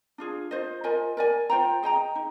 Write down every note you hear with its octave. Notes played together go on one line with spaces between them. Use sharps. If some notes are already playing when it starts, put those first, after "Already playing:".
D4 F4 G#4
F4 C5 D#5
F4 A#4 D#5 G#5
A#4 D5 G#5
F4 C5 G5 A#5
G#4 D#5 G5 A#5
D#4